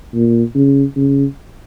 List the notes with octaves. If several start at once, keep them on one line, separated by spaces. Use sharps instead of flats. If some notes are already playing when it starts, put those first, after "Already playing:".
A#2
C#3
C#3